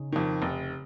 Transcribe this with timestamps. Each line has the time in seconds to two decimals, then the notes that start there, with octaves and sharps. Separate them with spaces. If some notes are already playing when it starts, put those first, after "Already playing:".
Already playing: C#3 C#4 D#4
0.12 F2 D#3
0.42 F1